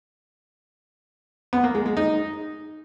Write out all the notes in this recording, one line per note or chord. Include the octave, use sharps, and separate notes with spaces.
B3
A#3
G#3
G#3
D#4